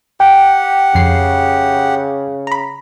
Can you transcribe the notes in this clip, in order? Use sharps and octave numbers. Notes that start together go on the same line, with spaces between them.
G4 F#5 G5
F2 C#3 C7
A#5 B5